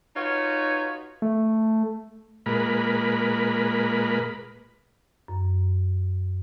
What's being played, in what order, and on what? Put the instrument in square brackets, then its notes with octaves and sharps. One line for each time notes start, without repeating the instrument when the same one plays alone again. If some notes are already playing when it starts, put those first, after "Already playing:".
[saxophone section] D#4 F4 F#4 B4 C#5
[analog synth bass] A3
[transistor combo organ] A#2 G#3 A#4 B4 B5
[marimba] F#2